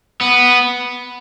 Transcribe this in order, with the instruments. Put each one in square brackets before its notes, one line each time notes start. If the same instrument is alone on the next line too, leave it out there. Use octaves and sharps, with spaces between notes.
[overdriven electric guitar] B3